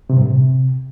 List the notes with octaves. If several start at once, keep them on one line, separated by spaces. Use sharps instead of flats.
C3
G2
A2
C3